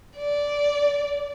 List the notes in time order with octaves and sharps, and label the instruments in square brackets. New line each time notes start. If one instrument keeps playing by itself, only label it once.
[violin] D5